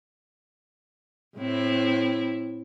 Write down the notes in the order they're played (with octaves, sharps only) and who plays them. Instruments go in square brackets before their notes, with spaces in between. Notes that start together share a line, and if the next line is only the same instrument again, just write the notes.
[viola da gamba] A2 C4 E4